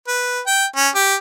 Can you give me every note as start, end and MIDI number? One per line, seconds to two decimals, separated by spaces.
0.08 0.40 71
0.47 0.66 79
0.76 0.89 61
0.95 1.15 67